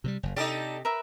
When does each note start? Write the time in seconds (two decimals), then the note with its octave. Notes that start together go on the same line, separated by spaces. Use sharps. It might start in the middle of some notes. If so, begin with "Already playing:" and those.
0.04 C3 F#3 G3
0.23 F#1
0.36 C3 D#4 G4 A4 D5 D#6
0.85 A#4 B4 E5